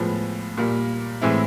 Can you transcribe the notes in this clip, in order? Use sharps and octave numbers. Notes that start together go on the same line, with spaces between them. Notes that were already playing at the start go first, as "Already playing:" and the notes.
Already playing: A2 F3 G#3 B3
A#2 G3 A#3
A2 E3 G#3 C4 E4